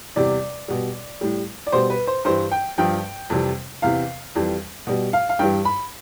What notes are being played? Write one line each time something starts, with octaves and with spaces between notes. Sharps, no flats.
E2 C3 G3 D5
B2 G3
A2 G3
D5
B2 G3 C5
B4
C5
G2 E3 G3 C5
G5
G2 F3 G5
F2 C3 E3 G3
E2 C3 E3 F5
F2 E3 G3
B2 G3
F5
F5
G2 E3 G3 G5
B5